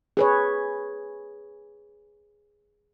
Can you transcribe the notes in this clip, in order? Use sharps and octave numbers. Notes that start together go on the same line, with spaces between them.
G#4 B4 C#5